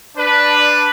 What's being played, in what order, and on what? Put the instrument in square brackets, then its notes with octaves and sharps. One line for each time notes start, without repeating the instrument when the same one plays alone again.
[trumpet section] D4 B4